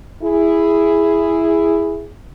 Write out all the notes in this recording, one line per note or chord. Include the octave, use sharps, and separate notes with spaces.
E4 G#4